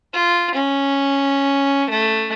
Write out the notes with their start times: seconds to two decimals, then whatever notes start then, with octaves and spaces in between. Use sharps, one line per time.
0.14 F4
0.55 C#4
1.90 A3